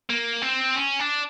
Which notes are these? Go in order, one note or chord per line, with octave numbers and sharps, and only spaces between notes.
A#3
C4
C#4
D4